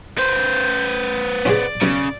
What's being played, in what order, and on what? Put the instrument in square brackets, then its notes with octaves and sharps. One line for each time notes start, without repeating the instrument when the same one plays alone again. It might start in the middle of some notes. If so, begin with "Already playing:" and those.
[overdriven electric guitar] B3 C5 [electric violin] G6
[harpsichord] C#4 F4 G#4 [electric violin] D5
[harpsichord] B1 [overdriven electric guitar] C#3